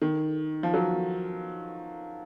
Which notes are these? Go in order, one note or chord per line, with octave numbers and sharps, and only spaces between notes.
D#3
F3
F#3